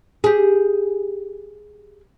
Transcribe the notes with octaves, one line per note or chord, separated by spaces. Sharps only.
G4 G#4